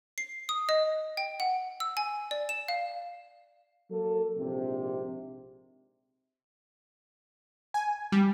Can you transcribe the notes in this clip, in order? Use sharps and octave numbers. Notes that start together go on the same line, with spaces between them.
C7
D#6
D#5
G5
F#5
E6
G#5
D5
E7
F5
F#3 A#3 A4
A#1 G#2 C3
G#5
G3